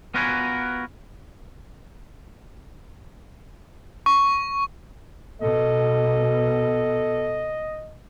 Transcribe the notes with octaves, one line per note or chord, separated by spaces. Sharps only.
B3 F4 F#4 A#4 B4 G#5
C#6
B2 A4 D#5